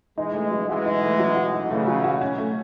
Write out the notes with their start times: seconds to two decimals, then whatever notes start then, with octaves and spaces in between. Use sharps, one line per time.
0.17 E3 G#3 D#4
0.34 A3
0.51 F#3
0.68 E3 G#3 F#4
0.86 D#4
1.03 A3
1.19 F#3
1.36 F#4
1.54 D#4
1.70 C#3 E3 A3
1.87 F#3
2.04 F#4
2.21 C#4
2.38 A3